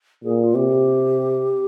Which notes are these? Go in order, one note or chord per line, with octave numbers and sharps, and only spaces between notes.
A#2 G#4
F4
C3 G4